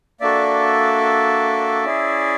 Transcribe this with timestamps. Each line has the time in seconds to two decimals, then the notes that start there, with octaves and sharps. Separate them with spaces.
0.21 A#3 D4 F#4 A4 D5 E5
1.84 C#4 E4 G#4